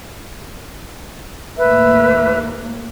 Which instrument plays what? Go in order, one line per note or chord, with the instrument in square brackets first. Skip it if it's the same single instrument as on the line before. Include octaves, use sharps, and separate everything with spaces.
[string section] D#2 A2 A#3 [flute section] B4 E5